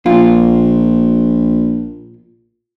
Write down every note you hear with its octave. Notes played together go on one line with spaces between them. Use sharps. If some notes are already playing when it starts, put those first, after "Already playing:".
A#1 A#2 F4